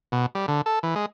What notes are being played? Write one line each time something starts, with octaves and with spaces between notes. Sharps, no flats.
B2
G3
D3
A4
E3
G#3